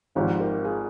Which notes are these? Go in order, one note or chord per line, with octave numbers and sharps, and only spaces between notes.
G#1 G#2 F3 D#4 G4
G4 A#4
F4 G#4